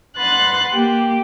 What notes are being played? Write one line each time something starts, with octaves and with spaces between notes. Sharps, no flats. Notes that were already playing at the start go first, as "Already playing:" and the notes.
B4 F#5 C6 F#6 A6
A#3 G4